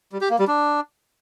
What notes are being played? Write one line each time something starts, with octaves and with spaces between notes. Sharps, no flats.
G3
G4
A#3
G3
D4